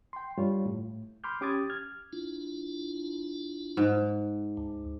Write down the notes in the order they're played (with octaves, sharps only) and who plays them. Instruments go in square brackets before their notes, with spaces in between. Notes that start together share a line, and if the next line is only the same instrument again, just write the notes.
[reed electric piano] G5 C6
G2 G3 F4 C#5
A2
B5 C6 D6 F6 G6
C#4 G4 D6 D#6 G#6 A6
F6 G#6
[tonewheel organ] D4 E4 F4
[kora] G#2
[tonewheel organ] D2